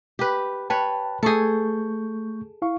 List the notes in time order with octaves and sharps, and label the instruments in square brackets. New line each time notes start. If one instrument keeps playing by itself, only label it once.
[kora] G4 B4
[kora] B4 C#5 [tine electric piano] G5 A5
[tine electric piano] A3 C#6 G6 [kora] G#4 A4
[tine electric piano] E4 F5 C#6